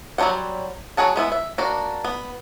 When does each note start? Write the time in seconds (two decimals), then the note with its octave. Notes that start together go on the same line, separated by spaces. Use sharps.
0.18 F#3 G3 D4 C5 F#5
0.97 F#3 F#4 G#4 F#5 A5
1.16 G#3 B3 E4
1.32 E5
1.58 A#3 D4 F#4
2.04 B3